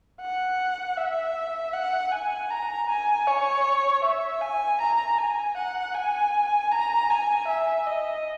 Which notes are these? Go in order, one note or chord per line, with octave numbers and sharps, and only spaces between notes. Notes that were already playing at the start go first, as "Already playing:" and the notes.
F#5
E5
F#5
G#5
A#5
G#5
C#5
E5
G#5
A#5
G#5
F#5
G#5
A#5
G#5
E5
D#5